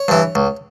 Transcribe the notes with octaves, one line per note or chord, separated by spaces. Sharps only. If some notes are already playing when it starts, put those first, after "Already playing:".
Already playing: C#5
G2 E3
C#2